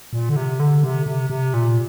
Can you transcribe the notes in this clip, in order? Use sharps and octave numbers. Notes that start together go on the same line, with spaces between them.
A#2
D3
C3
D3
C3
C3
C3
A#2